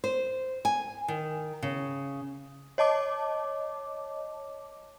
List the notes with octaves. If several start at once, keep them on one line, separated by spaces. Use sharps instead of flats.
C5
G#5
D#3
C#3
C#5 D#5 A5 D6